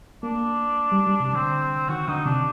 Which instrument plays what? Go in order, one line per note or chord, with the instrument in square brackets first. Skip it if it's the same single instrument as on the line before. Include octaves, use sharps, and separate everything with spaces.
[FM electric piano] A#3 [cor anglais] D4
[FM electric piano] G3
G3
C3
[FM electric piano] D3 [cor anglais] C4
[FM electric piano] D#3 [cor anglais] F#4
[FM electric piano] D3 [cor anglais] D#4
[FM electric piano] C3 [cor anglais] D4